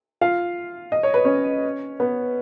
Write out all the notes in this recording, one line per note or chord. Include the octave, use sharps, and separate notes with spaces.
F4 F5
D#5
C#5
B4
C#4 C#5
B3 B4